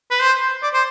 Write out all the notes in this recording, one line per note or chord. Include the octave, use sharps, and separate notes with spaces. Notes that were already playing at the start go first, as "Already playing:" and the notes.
B4
C5
D5
C5